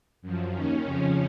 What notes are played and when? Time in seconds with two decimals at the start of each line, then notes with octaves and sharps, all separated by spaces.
0.22 F#2 F3
0.53 D#2 D#3 C#4
0.85 F2 C#3 F3